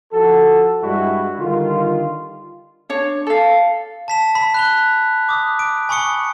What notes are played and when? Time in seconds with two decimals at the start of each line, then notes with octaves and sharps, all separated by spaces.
0.12 F3 F#4 A4
0.82 G2 G3 G#3 E4 F#4
1.38 D3 D#3 G3 F4
2.89 D4 C#5
3.27 A4 F5
4.08 A5 B6 E7
4.35 B5 B6
4.54 F#6 F7 G7
5.29 D6 D#6
5.59 D7
5.89 G#5 B5 C#6 D#6 C#7 G7